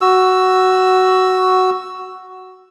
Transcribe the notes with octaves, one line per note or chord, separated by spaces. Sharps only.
F#4 E6